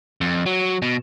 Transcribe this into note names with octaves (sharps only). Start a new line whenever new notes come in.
F2
F#3
B2